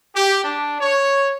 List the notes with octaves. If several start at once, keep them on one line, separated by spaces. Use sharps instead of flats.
G4
D4
C#5